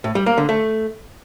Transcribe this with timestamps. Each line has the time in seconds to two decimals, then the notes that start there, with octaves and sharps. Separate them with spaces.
0.04 A2
0.15 G3
0.26 A#3
0.38 D3
0.49 A3